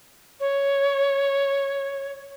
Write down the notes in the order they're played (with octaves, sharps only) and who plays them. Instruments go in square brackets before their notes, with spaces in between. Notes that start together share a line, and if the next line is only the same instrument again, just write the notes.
[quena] C#5